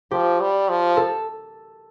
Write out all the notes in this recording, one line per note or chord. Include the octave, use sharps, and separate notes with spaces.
F3 G4
G3
F3
A4